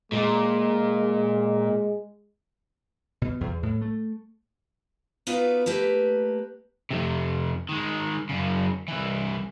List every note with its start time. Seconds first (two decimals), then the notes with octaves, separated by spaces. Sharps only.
0.12 A#2 G#3
3.22 B2
3.41 E2
3.63 A2
3.82 A3
5.27 B3 D#4 F4 F#4 B4 D5
5.66 A3 A#3 G4 B4
6.90 F2 C3
7.69 D#3 G#3
8.29 F#2 C#3
8.88 C2 E3